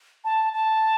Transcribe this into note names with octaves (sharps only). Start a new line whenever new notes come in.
A5
A5